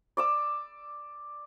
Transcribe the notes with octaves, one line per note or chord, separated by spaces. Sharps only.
D5 D6 E6